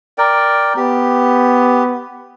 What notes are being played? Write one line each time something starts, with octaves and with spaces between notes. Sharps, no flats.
A#4 D5 G5
B3 G4